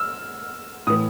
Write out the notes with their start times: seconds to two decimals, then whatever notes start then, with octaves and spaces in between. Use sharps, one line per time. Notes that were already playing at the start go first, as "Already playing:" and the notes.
Already playing: E6 F6
0.87 A2 E3 D#6